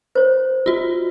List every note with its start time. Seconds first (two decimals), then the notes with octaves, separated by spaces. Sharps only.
0.15 C5 C#5
0.66 F4 F#4